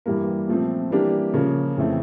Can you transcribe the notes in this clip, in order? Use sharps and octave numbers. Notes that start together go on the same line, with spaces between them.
G2 E3 G3 A#3
A#2 F3 A3 C4
E3 G3 A#3 D4 G4
C#3 F3 A#3 C#4
F2 C#3 E3 A3 C4